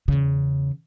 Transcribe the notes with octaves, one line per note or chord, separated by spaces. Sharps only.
E2 C#3